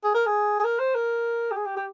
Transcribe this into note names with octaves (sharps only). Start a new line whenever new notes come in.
G#4
A#4
G#4
G#4
A#4
C5
A#4
G4
G#4
G4
G4